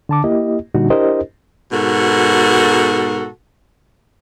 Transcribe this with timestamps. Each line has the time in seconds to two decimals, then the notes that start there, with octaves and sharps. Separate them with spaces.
0.09 D3 A5 D6
0.24 A#3 E4 G4 D#5
0.75 A#2 D3 G3 D#4 F#4
0.90 D4 E4 G4 A#4 C5 D#5
1.72 G#2 B2 F#4 A4 A#4